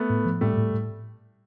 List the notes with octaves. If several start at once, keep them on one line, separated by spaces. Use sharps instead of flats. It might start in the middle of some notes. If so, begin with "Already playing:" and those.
Already playing: A3 B3
A2
F3
A2 G3 A3
A2
A2